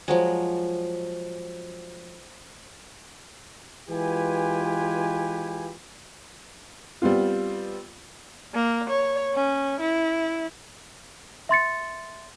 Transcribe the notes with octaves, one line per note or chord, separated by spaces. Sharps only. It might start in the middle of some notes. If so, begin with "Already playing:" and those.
F3 F#3 G#3
E3 G#3 F4 G4 B4 G#5
G3 B3 C4 F4
A#3
C#5
C#4
E4
E5 C6 A6 C#7